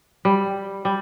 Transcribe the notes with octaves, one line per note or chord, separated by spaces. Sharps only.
G3
G3